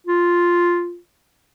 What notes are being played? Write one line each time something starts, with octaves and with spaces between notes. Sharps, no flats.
F4